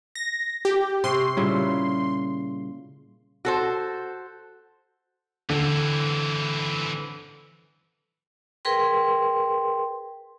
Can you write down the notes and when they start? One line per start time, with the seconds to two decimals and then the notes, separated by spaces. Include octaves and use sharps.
0.15 A#6
0.65 G4
1.04 C3 G4 C6 C#6
1.37 A#2 C#3 G3 E4
3.45 F#4 A4 C5
5.50 D3 E3 C4
8.65 G#4 A#4 B4 G5 C6